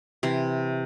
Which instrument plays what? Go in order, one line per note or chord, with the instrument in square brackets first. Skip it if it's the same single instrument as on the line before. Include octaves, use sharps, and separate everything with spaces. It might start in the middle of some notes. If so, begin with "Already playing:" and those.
[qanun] C3 E3 C6